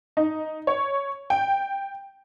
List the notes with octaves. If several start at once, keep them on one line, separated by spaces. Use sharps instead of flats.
D#4
C#5
G5